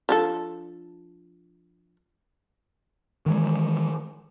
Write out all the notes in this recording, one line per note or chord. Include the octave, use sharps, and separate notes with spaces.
F3 D4 A4
D#3 E3 G#3